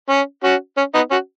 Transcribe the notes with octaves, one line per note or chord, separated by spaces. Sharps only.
C#4
C#4 F#4
C#4
B3 D#4
C#4 F#4